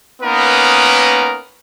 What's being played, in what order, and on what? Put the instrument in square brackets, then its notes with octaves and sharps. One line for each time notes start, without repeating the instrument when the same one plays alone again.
[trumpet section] A#3 B3 C#4 D#4 A#4 B4